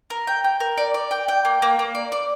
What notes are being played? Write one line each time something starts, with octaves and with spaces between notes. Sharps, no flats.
A#4
G5
G5
A#4
D5
D5
G5
G5
A#3
A#3
A#3
D5
D5